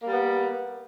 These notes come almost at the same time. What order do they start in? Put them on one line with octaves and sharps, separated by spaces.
A#3 G3 B3